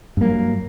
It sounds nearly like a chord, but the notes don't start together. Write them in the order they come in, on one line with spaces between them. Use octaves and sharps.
G2 A#3 F#3